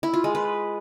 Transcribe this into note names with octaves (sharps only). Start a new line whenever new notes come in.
E4
F4
G#3
B4